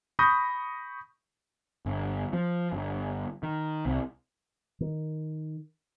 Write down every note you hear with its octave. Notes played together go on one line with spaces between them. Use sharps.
B5 C#6 D#6 G6 A#6
G1
F3
G1
D#3
C2
D#3